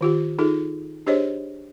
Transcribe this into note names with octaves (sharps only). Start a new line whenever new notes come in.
D#3 F4 G4
D#4 F4 G#4 A4
D4 G4 G#4 C5 C#5 D#5